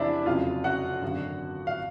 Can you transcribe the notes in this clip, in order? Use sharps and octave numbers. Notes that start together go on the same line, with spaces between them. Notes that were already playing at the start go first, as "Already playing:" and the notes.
Already playing: E2 C3 F3 D4 E4 D5 E5
F1 F2 C#3 F#3 F4 F5
F#4 F#5
G#1 F#2 D3 F#3
F5